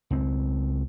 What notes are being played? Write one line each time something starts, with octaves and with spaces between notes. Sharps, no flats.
C#2 C4